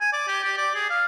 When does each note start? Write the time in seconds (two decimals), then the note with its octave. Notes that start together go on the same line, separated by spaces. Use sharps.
0.01 G#5
0.13 D5
0.28 G4
0.44 G4
0.58 D5
0.75 G#4
0.90 F5